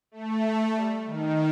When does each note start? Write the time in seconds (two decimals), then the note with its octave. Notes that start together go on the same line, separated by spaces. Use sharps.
0.11 A3
0.74 G3
1.06 D#3